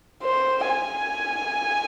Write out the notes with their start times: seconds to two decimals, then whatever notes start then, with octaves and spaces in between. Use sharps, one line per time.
0.23 C5
0.68 G#5